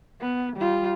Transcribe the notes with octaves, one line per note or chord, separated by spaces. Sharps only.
B3
G3 F4